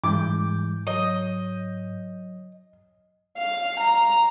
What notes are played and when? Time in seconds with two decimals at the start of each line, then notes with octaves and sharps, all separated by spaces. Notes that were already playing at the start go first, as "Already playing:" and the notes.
0.04 G#2 E3 G3 G#3 D6 G6
0.87 F#3 C#5 D#5
3.39 F5
3.80 A#5